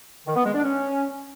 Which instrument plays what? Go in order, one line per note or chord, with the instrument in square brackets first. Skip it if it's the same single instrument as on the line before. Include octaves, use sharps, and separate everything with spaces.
[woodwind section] D#3
B3
G#3
D4
C#4